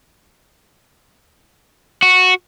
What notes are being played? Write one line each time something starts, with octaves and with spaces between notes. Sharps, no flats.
F#4